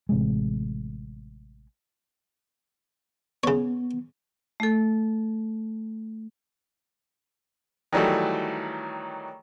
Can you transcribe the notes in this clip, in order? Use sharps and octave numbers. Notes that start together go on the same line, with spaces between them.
A1 C3 G#3
C#3 B3 C#5
A3 A4
D#3 E3 F#3 G3 A3